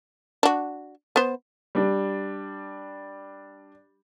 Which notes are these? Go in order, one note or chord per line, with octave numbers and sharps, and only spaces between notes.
D4 F#4
B3 C5
G3 D4